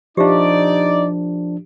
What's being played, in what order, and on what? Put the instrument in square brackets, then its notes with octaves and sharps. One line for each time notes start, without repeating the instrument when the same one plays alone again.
[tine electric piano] F3 D4 [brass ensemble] D#4 D5 [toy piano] G4 E5 F5